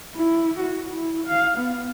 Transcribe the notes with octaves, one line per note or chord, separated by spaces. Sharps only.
E4
F#4
E4
F5
B3